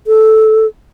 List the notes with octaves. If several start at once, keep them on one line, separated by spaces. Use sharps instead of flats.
A4